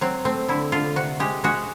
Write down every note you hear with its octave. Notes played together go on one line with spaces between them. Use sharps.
F#3 C4
A3 C4
D3 E4
D3 F4
C3 F#4
G#3 G4
G#3 F#4